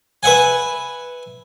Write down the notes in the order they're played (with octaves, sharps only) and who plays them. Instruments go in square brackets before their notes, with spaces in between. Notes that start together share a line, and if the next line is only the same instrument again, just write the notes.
[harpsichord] B4 E5 F#5 G#5